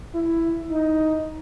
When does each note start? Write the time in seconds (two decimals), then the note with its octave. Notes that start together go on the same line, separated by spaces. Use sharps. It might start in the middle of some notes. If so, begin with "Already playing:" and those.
0.15 E4
0.71 D#4